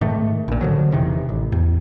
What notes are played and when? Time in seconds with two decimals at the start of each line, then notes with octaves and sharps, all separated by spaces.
0.01 G#2 D#3 A3
0.48 A#1 A#2
0.61 D3 F3 F#3
0.91 E1 C3 D#3 E3
1.29 A1
1.52 E2